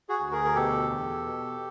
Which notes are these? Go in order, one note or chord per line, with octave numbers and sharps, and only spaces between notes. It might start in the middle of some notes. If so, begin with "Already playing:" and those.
F#4 G#4
D2
G#4 A#4
A#4
B2 G4 A4
E2
B2